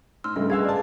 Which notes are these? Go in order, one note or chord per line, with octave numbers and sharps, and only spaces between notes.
G#2 C6 E6 F6
G2 C#3 A3 D#5
G#3 B4 F5 E6 G#6
D5 A5